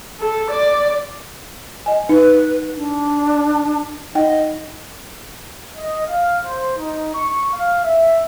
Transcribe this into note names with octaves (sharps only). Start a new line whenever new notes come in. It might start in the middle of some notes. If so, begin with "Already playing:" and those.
A4
D5
D#5 G#5
D#4 B4
D4
D#4 D#5 F#5 G5
D#5
F5
C5
D#4
C#6
F5
E5